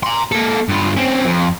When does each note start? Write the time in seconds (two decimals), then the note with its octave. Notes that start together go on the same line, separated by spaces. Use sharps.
0.03 A#5 C6
0.32 A#3 A4
0.69 G2 F4
0.96 C4 C#4
1.25 F2